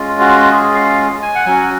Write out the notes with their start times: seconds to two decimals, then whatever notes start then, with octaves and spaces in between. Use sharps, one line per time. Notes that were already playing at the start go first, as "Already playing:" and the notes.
Already playing: G#3 C#4 F4
0.19 F#4
0.51 G#4
0.74 F5
1.22 G#5
1.35 F#5
1.45 F#3 C#4 F#4 G#5